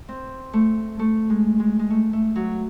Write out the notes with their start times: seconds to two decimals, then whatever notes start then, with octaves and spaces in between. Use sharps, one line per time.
0.08 C4
0.53 A3
0.99 A3
1.30 G#3
1.60 G#3
1.79 G#3
1.90 A3
2.13 A3
2.36 F#3